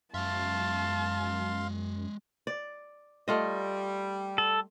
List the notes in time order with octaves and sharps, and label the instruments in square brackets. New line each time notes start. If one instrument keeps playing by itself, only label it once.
[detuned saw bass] F#2 [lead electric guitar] G#3 E5 [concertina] F5 C6 [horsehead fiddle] A5
[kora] D5
[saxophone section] G3 [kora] A3 F4 D#5
[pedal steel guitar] A4